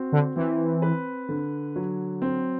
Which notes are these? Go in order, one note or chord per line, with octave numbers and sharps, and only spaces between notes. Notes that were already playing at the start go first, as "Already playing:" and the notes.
Already playing: C4 F#4
D3
E3 C4
B4
D3
F#3
C4